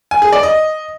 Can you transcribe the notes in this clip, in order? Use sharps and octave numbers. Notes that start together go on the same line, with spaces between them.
G#5
G#4
D5
D#5